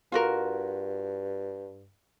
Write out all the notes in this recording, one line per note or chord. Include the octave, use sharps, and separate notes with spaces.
G2 F4 F#4 A#4